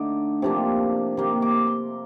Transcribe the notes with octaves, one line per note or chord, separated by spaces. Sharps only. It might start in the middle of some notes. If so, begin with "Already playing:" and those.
Already playing: D3 A3 D#4 D6
C3 F3 A#3 D4
C3 D#3 A#3 D#4 C6
D6
C6